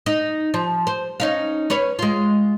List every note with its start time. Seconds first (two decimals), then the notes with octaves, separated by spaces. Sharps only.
0.06 D#4 D#5
0.54 F3
0.87 C5
1.20 C#4 D#4 F5
1.70 C#4 B4 C#5
1.99 G#3 F4